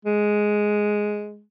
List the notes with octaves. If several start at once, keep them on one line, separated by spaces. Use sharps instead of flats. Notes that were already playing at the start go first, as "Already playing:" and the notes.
G#3